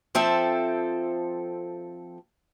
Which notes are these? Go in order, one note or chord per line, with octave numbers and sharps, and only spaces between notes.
F3 C4 A4 E5